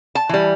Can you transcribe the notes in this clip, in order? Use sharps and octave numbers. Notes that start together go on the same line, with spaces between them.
A5
E3 G3